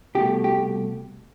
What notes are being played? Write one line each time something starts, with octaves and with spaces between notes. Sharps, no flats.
C2 B2 A3 G4
G4